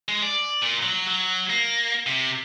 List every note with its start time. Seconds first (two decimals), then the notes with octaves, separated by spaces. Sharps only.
0.08 G#3
0.22 D5
0.62 A#2
0.83 F#3
1.07 F#3
1.50 A#3
2.06 C3